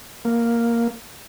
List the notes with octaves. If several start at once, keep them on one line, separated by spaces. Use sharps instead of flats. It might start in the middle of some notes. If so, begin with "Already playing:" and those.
A#3